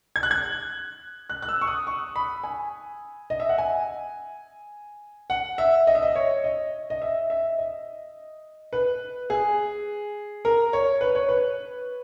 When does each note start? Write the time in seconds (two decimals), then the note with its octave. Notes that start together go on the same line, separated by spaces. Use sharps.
0.16 G#6
0.23 F#6
0.31 G#6
1.30 F#6
1.42 F#6
1.49 E6
1.61 C#6
1.67 D#6
1.87 C#6
2.16 B5
2.44 G#5
3.30 D#5
3.40 E5
3.49 F#5
3.58 G#5
5.30 F#5
5.58 E5
5.87 D#5
5.95 E5
6.03 D#5
6.15 C#5
6.44 D#5
6.90 D#5
7.02 E5
7.30 E5
7.58 D#5
8.73 B4
9.30 G#4
10.45 A#4
10.73 C#5
11.01 B4
11.15 C#5
11.29 B4